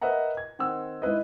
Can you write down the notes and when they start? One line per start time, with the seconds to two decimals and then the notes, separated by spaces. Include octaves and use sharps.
0.02 A#4 B4 D#5 E5 F#5 A#5
0.37 G#6
0.59 D#3 C4 F#5 E6
1.02 G#2 E4 B4 D#5